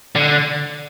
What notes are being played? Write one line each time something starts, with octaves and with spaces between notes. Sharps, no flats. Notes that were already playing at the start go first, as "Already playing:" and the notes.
D3